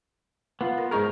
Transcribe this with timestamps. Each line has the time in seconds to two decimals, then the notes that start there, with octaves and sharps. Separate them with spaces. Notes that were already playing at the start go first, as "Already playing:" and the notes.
0.61 B3 F4
0.78 A#4
0.91 G#2 D#4 G#4 A#4 A#5 C#6